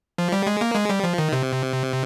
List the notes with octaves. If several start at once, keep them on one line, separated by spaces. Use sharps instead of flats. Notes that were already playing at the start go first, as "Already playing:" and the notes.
F3
G3
G#3
A#3
G#3
G3
F3
D#3
C3